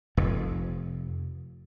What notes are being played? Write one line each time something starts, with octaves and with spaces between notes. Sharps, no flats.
F1 F2